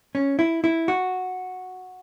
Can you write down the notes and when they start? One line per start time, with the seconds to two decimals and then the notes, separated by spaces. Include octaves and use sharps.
0.15 C#4
0.39 E4
0.64 E4
0.88 F#4